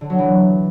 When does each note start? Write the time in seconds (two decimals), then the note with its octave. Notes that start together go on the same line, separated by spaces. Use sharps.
0.01 D3
0.10 F#3
0.19 E3